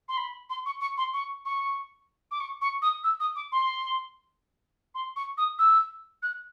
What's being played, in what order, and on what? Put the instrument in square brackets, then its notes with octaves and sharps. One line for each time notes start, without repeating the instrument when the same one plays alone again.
[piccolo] C6
B5
C6
C#6
C#6
C6
C#6
C#6
D6
C#6
C#6
D#6
E6
D#6
D6
C6
C6
C#6
D#6
E6
F#6